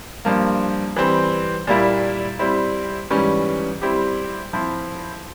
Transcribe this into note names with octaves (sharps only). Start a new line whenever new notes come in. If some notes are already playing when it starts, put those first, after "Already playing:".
G2 F3 A#3
E3 G3 C4
A#2 G3 A#3 E4
G3 C4 E4
G#2 E3 G3 C#4
G3 C4 E4 G4
F3 C4 E4